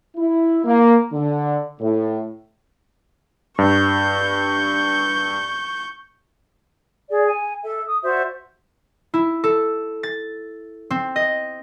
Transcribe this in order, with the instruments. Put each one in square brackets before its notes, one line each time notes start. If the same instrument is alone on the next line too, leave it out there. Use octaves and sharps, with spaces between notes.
[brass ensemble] E4
A#3
D3
A2
[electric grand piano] G2 [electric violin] C#6 G6
[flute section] G#4 D5
G#5
A4 E5
D#6
F#4 C5 D5 E5
[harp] E4
A4
A6
C4
D#5